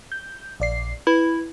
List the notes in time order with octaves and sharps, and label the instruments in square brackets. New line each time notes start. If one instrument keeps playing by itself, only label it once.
[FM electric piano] G6
A#1 D5 C7
[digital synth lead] E4 [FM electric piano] B4